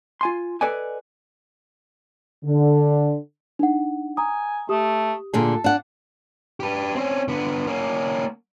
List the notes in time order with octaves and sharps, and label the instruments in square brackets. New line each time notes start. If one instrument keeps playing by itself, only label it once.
[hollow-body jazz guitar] F4 G#5 C6
A4 B4 D5 D#5 G#5
[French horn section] D3
[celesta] D4 D#4 F#5
[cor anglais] G#5 [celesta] A#5 D#6
[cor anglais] A3 [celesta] G4 D#6
[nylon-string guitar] A#2 D3 G#4 [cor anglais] A4
[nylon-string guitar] D4 F#5
[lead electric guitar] G4 B4
C4 C#4
D3 B3
A#3 C#4